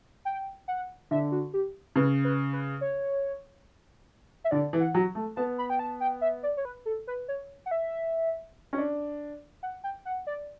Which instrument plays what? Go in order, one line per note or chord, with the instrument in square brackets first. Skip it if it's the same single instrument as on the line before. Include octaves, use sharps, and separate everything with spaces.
[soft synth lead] G5
F#5
[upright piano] D3 [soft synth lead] E5
[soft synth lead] F#4
G4
[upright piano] C#3 [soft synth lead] B4
[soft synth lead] B4
B4
C#5
E5
[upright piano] D3 [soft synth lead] D5
[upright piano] E3
[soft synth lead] F#5
[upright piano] F#3
A3
[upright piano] B3 [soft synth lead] A5
[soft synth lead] B5
G5
A5
G5
E5
D5
C#5
B4
A4
B4
C#5
F#5
E5
[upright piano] C#4
D4
[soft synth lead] F#5
G5
F#5
D5